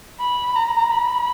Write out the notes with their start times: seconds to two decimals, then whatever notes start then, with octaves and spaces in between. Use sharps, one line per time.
0.20 B5
0.56 A#5
0.92 B5